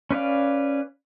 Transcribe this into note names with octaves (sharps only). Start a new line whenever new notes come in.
C#4 B4 D5 F5